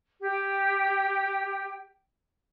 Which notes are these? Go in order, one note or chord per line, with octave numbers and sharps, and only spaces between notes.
G4 G5